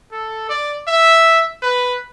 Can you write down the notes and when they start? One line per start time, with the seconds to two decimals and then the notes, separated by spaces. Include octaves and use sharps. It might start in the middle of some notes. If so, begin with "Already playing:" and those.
0.12 A4
0.49 D5
0.88 E5
1.63 B4